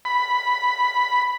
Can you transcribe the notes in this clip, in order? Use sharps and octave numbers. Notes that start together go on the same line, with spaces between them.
B5